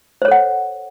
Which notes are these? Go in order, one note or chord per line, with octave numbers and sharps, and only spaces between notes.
A4 C5 C#5 F#5